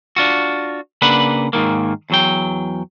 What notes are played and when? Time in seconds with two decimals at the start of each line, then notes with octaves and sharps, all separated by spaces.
0.16 D4 F4 F#4
1.02 C#3 A#3 D4 B4 F#5 B5
1.53 G#2 D#3 A#3
2.10 E2 F#3 G5